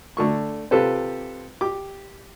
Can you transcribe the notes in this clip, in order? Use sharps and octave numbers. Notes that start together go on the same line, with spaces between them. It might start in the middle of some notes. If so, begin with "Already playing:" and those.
D3 A3 C#6
C3 F4 G4 A4 B4 C5
G4 D6